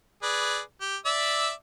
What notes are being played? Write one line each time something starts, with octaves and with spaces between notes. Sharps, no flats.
G#4 B4 D5
G4
D5 E5 E6